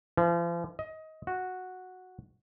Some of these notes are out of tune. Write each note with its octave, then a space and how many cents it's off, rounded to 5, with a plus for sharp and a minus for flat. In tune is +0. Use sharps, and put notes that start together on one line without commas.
F3 -40
D#5 +20
F#4 -5